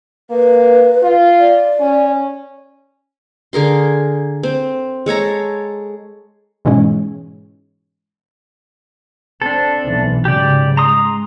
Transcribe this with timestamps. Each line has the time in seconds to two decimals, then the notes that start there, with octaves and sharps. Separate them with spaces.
0.30 A#3 B4
1.03 F4
1.39 D5
1.80 C#4
3.53 D3 G#4 A#4 C6
4.43 C4
5.06 G#3 A4 C#5 A#5
6.65 G#2 B2 E3 G#3 C#4
9.42 C4 D4 A4
9.85 B1 E3
10.25 G#2 C#3 F#3 G4 D5
10.77 G#3 A#5 C6 D#6